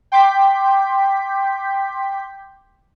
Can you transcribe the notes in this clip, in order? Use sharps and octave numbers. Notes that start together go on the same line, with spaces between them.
G5 C6 D6 G6 B6